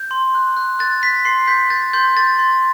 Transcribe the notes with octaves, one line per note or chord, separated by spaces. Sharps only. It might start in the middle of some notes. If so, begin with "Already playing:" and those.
Already playing: G6
C6
F#6
F#6
F#6 A6
F#6 B6
C6 C7
G6 B6
G6 A6
C6 G6
G6 A6
C6